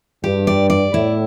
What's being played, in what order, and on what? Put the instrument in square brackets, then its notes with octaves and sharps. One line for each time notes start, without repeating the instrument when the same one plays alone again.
[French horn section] G2 [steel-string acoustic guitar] G4
[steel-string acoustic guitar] D5
D5
[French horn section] A2 [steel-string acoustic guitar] E4